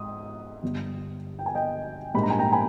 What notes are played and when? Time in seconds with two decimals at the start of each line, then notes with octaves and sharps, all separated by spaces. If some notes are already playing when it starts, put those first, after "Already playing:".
Already playing: G#2 D#6
0.63 G1 G2 G3
1.39 G5
1.46 G#5
1.55 D#5 G5
2.14 A#1 G#2 G3 A#3 B5
2.23 A#5
2.30 G#5
2.39 G5 A#5
2.52 G#5 B5